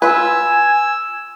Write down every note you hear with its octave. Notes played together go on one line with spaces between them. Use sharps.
F4 B4 G#5 E6